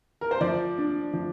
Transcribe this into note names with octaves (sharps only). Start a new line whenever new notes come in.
A#4
C5
F3 D5
D4
F3